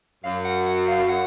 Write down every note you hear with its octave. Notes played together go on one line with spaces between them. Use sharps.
F#2 F5
F#5
F#5
F5
F#5